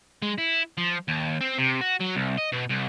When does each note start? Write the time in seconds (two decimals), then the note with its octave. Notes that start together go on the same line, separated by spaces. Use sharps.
0.22 G#3
0.38 E4
0.78 F3
1.08 D#2
1.41 C4
1.58 C3
1.81 F#4
2.01 F#3
2.15 C2
2.37 D#5
2.52 B2
2.69 C2